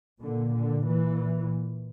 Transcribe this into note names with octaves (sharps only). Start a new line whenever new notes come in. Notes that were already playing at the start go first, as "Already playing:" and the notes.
A#2 D3
D3
A#2 E3